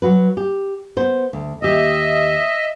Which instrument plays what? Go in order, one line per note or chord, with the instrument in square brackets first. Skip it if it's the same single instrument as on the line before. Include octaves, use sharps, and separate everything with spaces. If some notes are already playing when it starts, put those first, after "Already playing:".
[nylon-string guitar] F#3 F#4 B4
G4
B3 C5
D2
[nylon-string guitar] D#2 G4 [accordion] D#5 E5